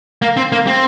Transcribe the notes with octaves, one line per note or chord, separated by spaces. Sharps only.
A#3
C4
A#3
C4